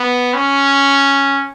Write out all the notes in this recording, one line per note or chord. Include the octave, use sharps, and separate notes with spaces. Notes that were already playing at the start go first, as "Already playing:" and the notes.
Already playing: B3
C#4